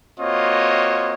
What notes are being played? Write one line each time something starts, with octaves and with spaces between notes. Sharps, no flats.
A#3 C4 F4 F#4 C#5 D#5